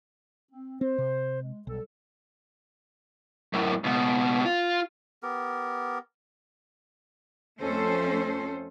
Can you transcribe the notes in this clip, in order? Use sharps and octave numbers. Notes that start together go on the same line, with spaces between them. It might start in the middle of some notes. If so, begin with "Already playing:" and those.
C4
C4 C5
C3
G#3
B1 G3 A4
F#2 A2
C#2 B2
F4
B3 G4 A#4
F2 A3 C#4 A4 C5